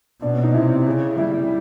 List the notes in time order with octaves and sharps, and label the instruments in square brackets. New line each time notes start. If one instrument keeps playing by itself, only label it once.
[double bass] B2 [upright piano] D4
[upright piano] C#4
D#4
[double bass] C3 [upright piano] E4
[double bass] C#3
[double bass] G3 [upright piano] E4